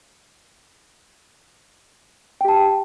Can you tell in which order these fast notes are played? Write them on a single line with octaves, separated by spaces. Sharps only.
G5 G4 A5